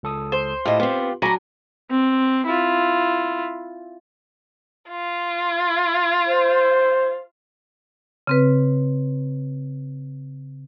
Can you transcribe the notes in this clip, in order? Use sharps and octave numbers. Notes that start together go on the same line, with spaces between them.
C#2 A4 D#6
C5
A2 E4 F4 G4 D#5
B3 C4 F4 G4 C6
F#3 D4 G#5 A#5 B5 C#6 D6
C4
E4 F4
F4
C5
C#3 C4 B4